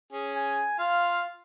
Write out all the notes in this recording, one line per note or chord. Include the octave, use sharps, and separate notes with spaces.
C#4 G#4
G#5
F4 F5